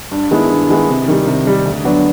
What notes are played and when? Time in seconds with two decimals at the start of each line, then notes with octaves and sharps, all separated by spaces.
0.11 G2
0.31 D#3 G#3 B3 E4
0.49 G2
0.69 D#3 G#3 B3 E4
0.89 C3
1.08 D#3 G3
1.26 C3
1.46 D#3 G3
1.65 D2
1.84 D3 F#3 B3 D4